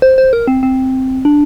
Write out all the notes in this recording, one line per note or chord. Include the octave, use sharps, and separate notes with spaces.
C5
C5
A#4
C4
C4
D4